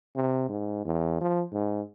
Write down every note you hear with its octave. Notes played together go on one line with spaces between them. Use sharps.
C3
G#2
E2
F3
G#2